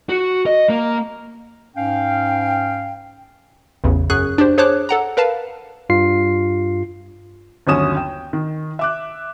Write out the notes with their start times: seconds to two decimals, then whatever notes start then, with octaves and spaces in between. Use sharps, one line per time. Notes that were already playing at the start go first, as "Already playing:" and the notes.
0.09 F#4
0.46 D#5
0.69 A#3
1.76 G#2 C#4 F5 G5
3.84 A1 E2 C#3
4.10 F#2 G#4 C#6 F#6
4.38 D4 G4 C5
4.58 G#4 C5 C#5 A5 D6 F#6
4.89 A4 F#5 A#5
5.17 A#4 B4 F5 A5
5.89 G2 F4 C7
7.67 G1 D#2 F#3 C#4 D#6 E7
7.96 G5
8.33 D#3
8.79 E5 D6 F#6